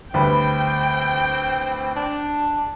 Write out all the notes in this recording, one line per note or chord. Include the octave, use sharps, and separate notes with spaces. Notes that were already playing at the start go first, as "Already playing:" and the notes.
D2 G3 C4 B4 G5
D4